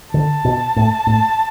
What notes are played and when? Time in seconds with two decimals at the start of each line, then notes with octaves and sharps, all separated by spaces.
0.14 D3 A5
0.45 B2
0.76 A2
1.07 A2